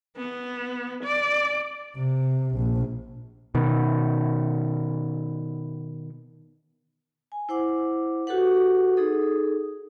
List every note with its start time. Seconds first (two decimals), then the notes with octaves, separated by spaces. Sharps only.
0.17 B3
1.04 D5
1.96 C3
2.55 A#1
3.55 B2 D#3
7.32 G#5
7.49 E4 C5 F#5 D6
8.27 F#4 G4 A4 B4 F#5
8.97 D#4 G#4 A4 D#6